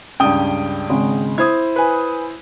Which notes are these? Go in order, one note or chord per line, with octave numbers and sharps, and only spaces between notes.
C#2 G2 G5 D#6
G#1 C#3 G#3
E4 C5 D#6 G#6
B4 G#5